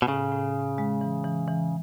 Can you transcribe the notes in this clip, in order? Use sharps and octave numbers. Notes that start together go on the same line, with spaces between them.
B2
A2 C#3
A2
A2
G#3
E3
E3
E3